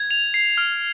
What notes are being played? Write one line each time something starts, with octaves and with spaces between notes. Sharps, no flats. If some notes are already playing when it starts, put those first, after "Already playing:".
Already playing: G#6
F7
C7
F6